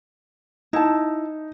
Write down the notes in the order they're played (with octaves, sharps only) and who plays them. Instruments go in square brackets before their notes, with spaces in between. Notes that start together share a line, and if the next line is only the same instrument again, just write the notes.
[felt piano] D#4 [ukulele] E4 A5